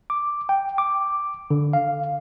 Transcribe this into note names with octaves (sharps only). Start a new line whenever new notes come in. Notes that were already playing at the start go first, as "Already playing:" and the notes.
D6
G5
D6
D3
F5